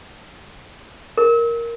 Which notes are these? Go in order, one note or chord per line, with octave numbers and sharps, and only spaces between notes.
A#4